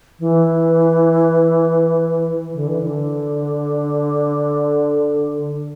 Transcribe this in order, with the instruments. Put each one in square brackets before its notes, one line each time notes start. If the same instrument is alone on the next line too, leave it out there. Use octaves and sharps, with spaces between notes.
[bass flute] E3
D3
E3
D3